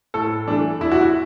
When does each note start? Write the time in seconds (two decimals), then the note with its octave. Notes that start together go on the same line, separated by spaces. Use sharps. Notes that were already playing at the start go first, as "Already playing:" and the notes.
0.14 A2 A4
0.48 E3 A3 D4
0.80 E2 E4
0.92 F#4
1.01 E4